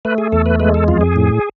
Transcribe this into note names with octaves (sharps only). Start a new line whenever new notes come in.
A3 B4
G#4
E2 A4
B4
G#3 B4
A4
F2 F4
G#4
A2